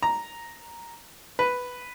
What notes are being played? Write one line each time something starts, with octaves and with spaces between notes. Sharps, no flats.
A#5
B4